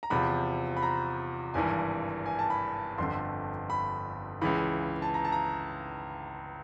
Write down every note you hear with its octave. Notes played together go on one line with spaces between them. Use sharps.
A#5
E2 C3 F3 B5
B5
A#5
G#1 G2 E3 G#5
G#5
A5
B5
G1 F2 D3 C6
B5
C#2 C#3 E3 B5
A5
A#5
A5
A#5